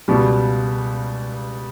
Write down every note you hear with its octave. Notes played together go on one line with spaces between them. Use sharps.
C#2 B2 G3